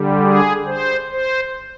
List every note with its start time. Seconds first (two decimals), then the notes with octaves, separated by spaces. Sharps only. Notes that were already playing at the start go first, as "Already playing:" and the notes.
Already playing: D3 G3
0.23 G#4
0.66 C5
1.10 C5